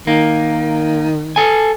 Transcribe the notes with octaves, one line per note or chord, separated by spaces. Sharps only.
D#3 A#3
A4 G#5